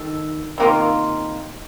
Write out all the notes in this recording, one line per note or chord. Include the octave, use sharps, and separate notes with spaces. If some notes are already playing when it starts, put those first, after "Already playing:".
Already playing: D#3 A4
C3 D#3 A#3 F4